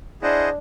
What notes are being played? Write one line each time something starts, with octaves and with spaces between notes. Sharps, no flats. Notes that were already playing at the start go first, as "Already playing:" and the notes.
D4 E4 G#4 C5 D#5 F#5